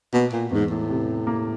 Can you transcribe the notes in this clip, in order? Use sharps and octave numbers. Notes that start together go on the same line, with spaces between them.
B2 A#3
A#2
E2 G#2
A2
C3
A#3